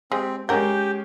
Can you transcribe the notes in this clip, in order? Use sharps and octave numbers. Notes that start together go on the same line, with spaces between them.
G#3 C4 G4 G#4
G#3 C#4 G4 A#4 F#5 G6